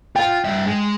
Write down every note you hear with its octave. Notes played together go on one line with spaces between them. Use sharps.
F4 G5
G2 E5
G#3